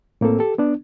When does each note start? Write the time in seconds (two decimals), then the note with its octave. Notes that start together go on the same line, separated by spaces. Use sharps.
0.21 A2 A#3 C4 A4
0.39 G4 A4
0.58 B3 D4